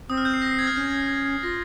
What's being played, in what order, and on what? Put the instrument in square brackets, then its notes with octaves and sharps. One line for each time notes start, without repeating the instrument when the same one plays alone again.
[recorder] C4 [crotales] D#6
[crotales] F6
G6
C7
A#6
C7
G#6
F6
[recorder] C#4 [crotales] G6
[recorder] F4 [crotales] A#6